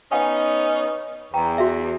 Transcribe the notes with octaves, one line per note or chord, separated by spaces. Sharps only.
B3 C#4 D#4 F#5 G#5
E2 G5 A#5
F#4 E5